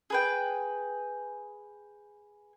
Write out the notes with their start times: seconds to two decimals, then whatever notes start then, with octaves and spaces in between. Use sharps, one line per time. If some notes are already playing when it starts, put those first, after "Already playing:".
0.10 G#4 B4 G5